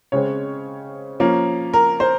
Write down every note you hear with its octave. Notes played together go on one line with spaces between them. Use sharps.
C#3 G#3 C4 C#5
F3 A#3 C#4
A#4
C5